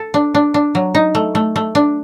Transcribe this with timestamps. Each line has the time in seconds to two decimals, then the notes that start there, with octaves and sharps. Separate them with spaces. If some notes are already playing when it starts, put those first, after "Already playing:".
Already playing: A4
0.14 D4
0.35 D4
0.54 D4
0.75 F#3
0.95 D#4
1.15 A3
1.35 A3
1.56 A3
1.75 D4